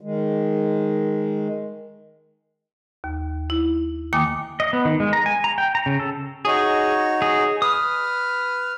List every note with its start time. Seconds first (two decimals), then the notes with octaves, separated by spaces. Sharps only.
0.01 D#3 G#3
3.04 D#2
3.50 E4
4.13 D#3 A#3 G5 G#5 D6 D#6
4.60 D#5
4.73 B3
4.85 D#3
5.00 G#3
5.13 A#5
5.26 G#5
5.44 A#5
5.58 G5
5.75 A#5
5.86 C#3
6.00 A4
6.45 D#4 F#4 G#4 C#5
7.22 G#4
7.62 B4 D#6 F6